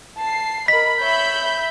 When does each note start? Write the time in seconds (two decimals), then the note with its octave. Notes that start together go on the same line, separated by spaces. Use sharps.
0.17 A5 C7
0.68 A#4 D#5 B5 B6
1.01 C#5 E5 B5 G6